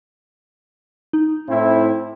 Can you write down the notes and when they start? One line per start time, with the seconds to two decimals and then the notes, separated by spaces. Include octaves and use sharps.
1.13 D#4
1.49 A2 C4 E4